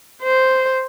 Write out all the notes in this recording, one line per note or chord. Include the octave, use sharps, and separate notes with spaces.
C5